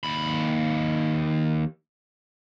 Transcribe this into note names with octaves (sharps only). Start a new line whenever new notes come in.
D#2 B5